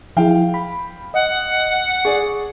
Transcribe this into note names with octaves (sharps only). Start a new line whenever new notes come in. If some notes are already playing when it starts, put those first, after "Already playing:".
F3 E4 G#4 F5 G5
B5
D#5 F#5
G#4 D5 C#6